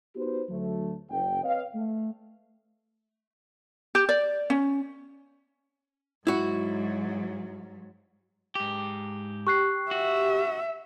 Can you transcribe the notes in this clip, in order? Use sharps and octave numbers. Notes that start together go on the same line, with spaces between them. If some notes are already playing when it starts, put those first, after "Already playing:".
B3 D#4 F#4 G4 B4 C5
D2 F#3 A3
F#1 G5
C4 B4 C#5 D#5 F5
A3
G4
D5
C#4
G#2 F#3 E4 F#4
G#2 G4
G4 C#6 F#6 C7
F#4 E5